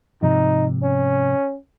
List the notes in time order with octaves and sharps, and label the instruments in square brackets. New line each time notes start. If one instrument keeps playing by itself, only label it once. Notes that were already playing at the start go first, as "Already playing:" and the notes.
[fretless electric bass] G#2 C3 F3 [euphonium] D#4
[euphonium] C#4